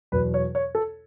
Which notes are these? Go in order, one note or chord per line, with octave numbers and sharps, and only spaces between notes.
E2 B2 F#3 B4
C#5
C#5
A4